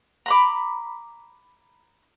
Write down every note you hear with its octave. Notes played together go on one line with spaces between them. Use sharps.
A#5 B5 D6